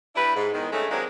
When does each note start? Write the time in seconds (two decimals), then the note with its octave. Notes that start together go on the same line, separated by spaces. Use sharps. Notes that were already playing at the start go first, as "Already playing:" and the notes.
0.16 G3 D4 E4 B4
0.35 G#2
0.53 E2 D#3 G#3
0.72 G2 C#3 G#3 A3
0.90 D#3 F#3 G#3 A#3 C4 D4